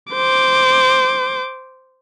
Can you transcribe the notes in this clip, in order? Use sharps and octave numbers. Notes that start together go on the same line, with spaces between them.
C5 D6